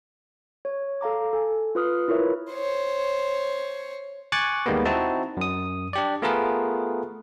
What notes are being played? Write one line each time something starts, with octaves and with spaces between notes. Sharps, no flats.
C#5
A4 F5 A#5 D6
A4 G#5
F4 B4 D#6 F6
E4 F4 A#4 B4 C#5 E5
C5 C#5
G#5 C#6 D6 F#6 A6
D#2 D#3 G3 G#3 A#3 B3
C4 D#4 E4 F#4 A5
F#2 D#6
D4 G4 D5
A3 B3 F4 G#4 A#4 B4